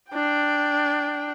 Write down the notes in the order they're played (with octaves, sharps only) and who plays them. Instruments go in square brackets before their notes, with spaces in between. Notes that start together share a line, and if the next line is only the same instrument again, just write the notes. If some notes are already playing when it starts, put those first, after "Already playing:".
[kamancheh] D4 G5